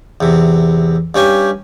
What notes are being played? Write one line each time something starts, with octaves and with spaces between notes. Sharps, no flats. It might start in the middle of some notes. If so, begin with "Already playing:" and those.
E2 C3
G2 C#4 G4 G#5